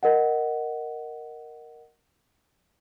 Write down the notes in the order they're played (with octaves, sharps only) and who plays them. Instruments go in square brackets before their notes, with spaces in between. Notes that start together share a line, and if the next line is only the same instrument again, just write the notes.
[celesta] A#4 D#5 F#5